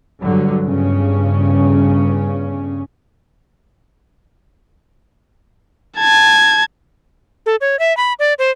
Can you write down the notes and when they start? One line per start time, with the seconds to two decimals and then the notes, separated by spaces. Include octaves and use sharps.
0.22 G2 D3 F#3
0.63 G1 G2 C#3 C#4
5.98 A5 G#6
7.46 A4
7.61 C#5
7.79 E5
7.97 B5
8.19 D5
8.39 C5